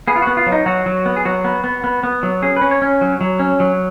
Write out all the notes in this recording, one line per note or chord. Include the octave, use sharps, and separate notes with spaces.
B3 G#4
F4
B3 F#4
F4
F#3
D#4
F#3 F#4
F#3
B3
G#4
F#3 F#4
B3
B3
B3
B3
F#3
C#4 G#4
C#4 B4
C#5
C#4
F#3
F#3
C#4
F#3